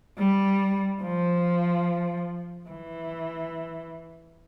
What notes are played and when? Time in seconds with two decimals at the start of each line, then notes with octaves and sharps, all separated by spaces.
0.18 G3
1.02 F3
2.69 E3